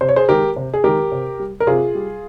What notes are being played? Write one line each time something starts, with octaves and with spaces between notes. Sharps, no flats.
C3 C5
C#5
G#4 C5
D#3 G#3 G4 A#4
C3
G#4
D#3 G#3 G4 A#4
C3
G3
A#4
C3 F4 G#4
G3